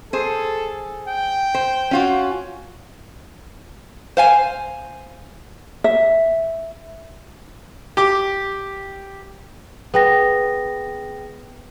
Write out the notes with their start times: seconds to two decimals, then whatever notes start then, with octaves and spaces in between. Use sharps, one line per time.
0.13 G#4 A4 C5
1.08 G5
1.55 C5
1.91 C#4 F4 F#4
4.17 C5 F5 G#5
5.84 E5
7.97 G4 D6
9.94 B3 G#4 G5 A#6